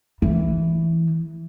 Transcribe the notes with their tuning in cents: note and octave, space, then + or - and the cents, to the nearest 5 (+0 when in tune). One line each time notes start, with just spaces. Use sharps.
E3 +0